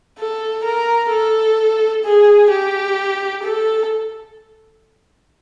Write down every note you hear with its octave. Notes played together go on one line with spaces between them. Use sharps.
A4
A#4
A4
G#4
G4
A4